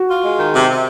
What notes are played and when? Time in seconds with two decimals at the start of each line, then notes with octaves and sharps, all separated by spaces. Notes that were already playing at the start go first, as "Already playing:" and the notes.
Already playing: F#4
0.08 F4
0.23 G#3
0.38 D#3
0.53 C3
0.69 C3